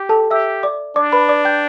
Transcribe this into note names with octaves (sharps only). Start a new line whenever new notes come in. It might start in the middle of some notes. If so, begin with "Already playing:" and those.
Already playing: G4
A4 A5
G4 E5 E6
D5 D6
D4 D5 D6
B4 B5
D5 D6
G5 G6